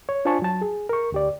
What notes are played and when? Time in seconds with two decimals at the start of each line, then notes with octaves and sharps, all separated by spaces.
0.09 C#5
0.25 D4 F4 C5 G#5 A5 C#6
0.42 F#3 A5
0.61 G#4
0.89 A#4 C#6
1.12 D2 G4 D5